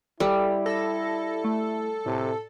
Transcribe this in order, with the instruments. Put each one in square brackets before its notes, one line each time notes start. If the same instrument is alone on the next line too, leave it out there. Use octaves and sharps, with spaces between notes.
[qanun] G3 [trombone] E4 [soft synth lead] A4
[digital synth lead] A4 [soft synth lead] A#6
[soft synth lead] A3
[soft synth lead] A2 [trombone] C3